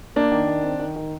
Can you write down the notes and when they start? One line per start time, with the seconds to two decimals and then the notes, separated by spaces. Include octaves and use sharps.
0.16 A#3 D4
0.32 D#3
0.47 D#3
0.63 C4
0.79 D#3
0.96 D#3